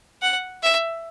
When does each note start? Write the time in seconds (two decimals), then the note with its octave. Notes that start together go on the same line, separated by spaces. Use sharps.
0.22 F#5
0.63 E5